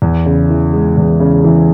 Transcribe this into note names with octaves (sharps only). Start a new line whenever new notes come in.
E2
C#3
E3
G#3
E2
C#3
E3